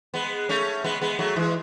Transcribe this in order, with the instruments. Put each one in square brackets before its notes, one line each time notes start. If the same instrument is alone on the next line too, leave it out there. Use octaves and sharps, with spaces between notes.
[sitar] G#3 B3
A3 C#4
G#3 B3
G#3 B3
F#3 A3
E3 G#3